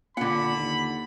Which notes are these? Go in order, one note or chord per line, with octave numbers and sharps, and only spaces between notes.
A#2 D3 F#5 B5
D#2